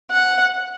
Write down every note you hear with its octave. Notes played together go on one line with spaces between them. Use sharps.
F#5